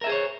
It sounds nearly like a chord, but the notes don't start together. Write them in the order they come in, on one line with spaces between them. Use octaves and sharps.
A#4 E5 G#4 C5 C#5